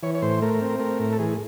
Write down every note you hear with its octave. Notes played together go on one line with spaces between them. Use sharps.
E3 C#5
C#5
A2 C5
A3 A#4
C4
A3 A#4
A2
A4
E3 G#4